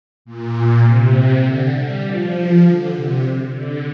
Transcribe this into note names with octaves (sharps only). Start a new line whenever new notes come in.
A#2
C3
D3
G3
F3
D3
C3
D3